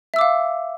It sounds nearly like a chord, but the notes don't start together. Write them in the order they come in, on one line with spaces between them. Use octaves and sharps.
E5 E6 D6 F5